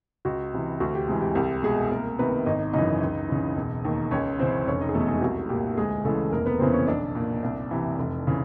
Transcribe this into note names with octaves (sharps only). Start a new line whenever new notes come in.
C#2 F#4
C3 E3
D2 F#4
G4
C3 E3 G#3 G#4
G4
C2 G4
B2 G#3 G#4
C2 A#3 A#4
C3 D#3 B3 B4
G#1 D#4 D#5
F#2 C#3 E3 D#4 D#5
C#2
C#3 E3
E1
D#2 D#3
C#2 C#4 C#5
C#3 E3 C4 C5
F1 C#4 C#5
D#4 D#5
G#4
E2 B2 A3 A4
G#3 G#4
G4
C2 F#4
A#2 G4
D2 G#3 G#4
C#3 E3 A3 A4
F1 A#3 A#4
B3 B4
E2 C#3 E3 C4 C5
C#4 C#5
B1 D4 D5
A#2
C2
C3 E3
F1
C#3 E3